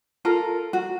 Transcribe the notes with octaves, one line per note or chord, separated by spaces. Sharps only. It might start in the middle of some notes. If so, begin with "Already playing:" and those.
F4 A4 A#4
F#4